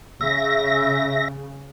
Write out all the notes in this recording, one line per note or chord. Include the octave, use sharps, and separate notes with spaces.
C#3 E5 A#6